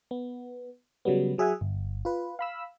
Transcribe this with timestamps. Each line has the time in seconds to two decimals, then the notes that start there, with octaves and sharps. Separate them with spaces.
0.11 B3
1.05 C#3 F#3 G3 B3
1.38 F#3 G#4 E5 F#5 G#5
1.61 G1
2.05 F4 B4
2.39 F5 B5 E6